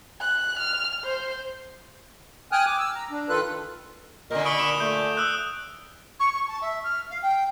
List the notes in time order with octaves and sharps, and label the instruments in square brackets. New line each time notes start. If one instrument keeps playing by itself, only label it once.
[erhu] F#6
F6
C5
[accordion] G5 G#5 D#6 F6 F#6
D6
E6
A#5
D4
D#3 F4 A4 B4 F#6
[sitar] A#2 D3 [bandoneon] A#4 D#5
[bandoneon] B5 C#6 [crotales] D#6 D7 G7
[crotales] D7 E7
[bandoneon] A3 [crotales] G6
[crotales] D#6 E6 F#6
[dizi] C#6
C#6
A5
E5
F6
F5
G5